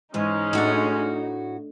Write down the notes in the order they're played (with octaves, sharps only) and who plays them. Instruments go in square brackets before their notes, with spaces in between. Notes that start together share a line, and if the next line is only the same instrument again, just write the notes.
[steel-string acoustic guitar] G#2 E3 [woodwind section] G#3 C#4 [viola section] D#4
[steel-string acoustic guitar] A2 F#4 [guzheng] A3 D4